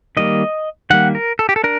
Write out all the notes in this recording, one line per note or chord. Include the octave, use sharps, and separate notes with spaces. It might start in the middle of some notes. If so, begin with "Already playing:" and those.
D#3 G3 A#3 D#5
D#3 G3 A#3 F#5
A#4
A4
G4
A4
D4 A#4